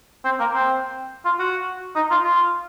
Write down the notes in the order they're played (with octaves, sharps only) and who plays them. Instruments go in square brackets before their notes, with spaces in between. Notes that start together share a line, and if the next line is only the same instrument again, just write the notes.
[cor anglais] C4
A#3
C4
F4
F#4
D#4
F4
F4